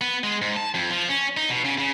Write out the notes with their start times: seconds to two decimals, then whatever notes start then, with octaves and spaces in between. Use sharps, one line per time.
0.01 B3
0.23 G#3
0.42 G#2
0.57 A5
0.74 F2
0.90 F3
1.09 C#4
1.37 D#4
1.50 B2
1.65 C#3
1.78 C#3